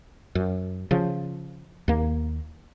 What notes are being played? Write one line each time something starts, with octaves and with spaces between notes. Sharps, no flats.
F#2
C#3 F3
D#2 A#3